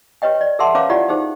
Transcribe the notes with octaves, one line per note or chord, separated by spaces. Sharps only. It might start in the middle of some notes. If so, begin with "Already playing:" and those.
G4 B4 C#5 D#5 G5
D5
G#4 A#4 E5 F#5 A5 C6
C#4 B4 C#5 F5 A#5 D6
E4 F4 G4 D5 F#5
D#4 G4 G#4 C5